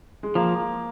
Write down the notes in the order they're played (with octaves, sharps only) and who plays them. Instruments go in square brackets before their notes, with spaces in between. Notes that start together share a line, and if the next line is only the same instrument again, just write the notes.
[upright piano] G#3
[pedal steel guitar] F3 [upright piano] A#3